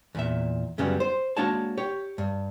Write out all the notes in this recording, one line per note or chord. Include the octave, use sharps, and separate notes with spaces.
E2 A#2 E5
F#2 C#3 F#3 G3 B3
C5
G#3 A#3 D4 F#4 C#5 A5
G4 C#5
G2